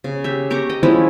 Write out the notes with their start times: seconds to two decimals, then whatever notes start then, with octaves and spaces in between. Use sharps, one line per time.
0.04 C#3
0.24 G4 E5
0.50 G4 A#5 C#6 D6
0.69 D#5 G5
0.83 F3 G#3 C#4 E4